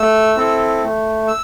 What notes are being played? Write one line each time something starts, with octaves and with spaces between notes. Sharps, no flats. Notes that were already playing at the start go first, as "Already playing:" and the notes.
Already playing: A3 E6
C4 E4 A4
A3
E6